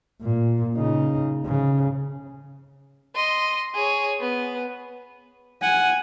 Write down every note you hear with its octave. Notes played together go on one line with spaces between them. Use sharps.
A#2
C#3 D#4
C#3
D#5 C6
G#4 C#5
B3
F#5 G#5